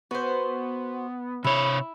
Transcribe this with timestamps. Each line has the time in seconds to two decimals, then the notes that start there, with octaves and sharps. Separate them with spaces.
0.11 B3 F#4 C5
1.44 C3 E4 C#5